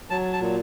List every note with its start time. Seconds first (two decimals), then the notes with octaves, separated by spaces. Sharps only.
0.10 F#3 A5
0.33 A5
0.41 A#2